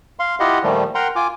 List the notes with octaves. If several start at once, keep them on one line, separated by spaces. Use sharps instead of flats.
F5 C6
E4 F4 G4 D#5 F#5
A#2 D#3 F3 G3 A3
A#4 F#5 G5 A#5 C6
F4 G#5 D6